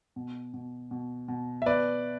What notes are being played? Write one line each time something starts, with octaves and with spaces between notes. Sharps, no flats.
B2
B2
B2
B2
E5
B2 B4 D5